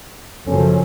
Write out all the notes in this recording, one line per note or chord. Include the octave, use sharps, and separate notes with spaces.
F#1 F#2 F3 C#4 A4